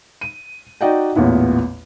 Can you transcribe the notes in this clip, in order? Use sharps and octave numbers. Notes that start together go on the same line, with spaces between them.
D#7
D#4 F#4 D5 D#5 G5
A1 E2 A#2 B3 E4